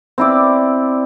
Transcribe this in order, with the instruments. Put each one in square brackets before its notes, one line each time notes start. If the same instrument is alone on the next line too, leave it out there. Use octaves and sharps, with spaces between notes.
[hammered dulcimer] C4 E4 D5